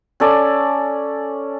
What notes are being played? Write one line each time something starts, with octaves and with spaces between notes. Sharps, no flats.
C#4 A4 D5